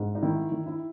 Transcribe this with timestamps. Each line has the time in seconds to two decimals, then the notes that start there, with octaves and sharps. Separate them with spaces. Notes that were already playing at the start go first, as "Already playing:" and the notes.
Already playing: G#2
0.15 D#4
0.22 D#3 E4
0.52 D#3
0.66 E4